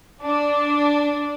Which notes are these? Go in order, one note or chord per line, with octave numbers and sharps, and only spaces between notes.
D4